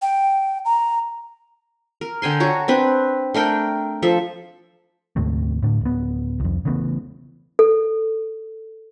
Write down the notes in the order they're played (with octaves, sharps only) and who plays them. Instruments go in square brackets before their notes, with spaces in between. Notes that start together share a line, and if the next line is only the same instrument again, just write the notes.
[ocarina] G5
A#5
[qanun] A#4
D3 G5 G#5 C6
F#4 C#5 A5 A#5
C4 D4 B4
A3 D4 A#4 G5
F3 A4 E5
[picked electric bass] D2 G#2 C3 A3
A2 D3
D1 B3
C2 F2
C#3 E3 A3 B3
[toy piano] A4